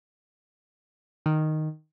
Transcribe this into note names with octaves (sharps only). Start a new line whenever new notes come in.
D#3